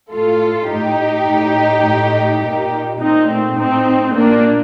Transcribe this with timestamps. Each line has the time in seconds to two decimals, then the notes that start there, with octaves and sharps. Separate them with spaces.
0.12 A2 F4 A4
0.69 A2 D#4 G4
1.27 A2
1.85 A2
2.43 A#2
3.00 A#2 C4 D#4
3.29 A3 C4
3.58 A2 C4 D#4
4.16 A#2 A#3 D4